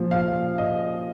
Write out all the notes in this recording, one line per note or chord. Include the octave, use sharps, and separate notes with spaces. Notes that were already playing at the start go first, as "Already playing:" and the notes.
Already playing: A#2 F3
F5
D#5